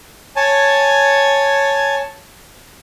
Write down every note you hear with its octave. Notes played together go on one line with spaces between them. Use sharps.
C#5 G#5 A5